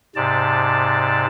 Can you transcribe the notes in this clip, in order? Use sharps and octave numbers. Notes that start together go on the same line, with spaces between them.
G#2 C3 D5 A5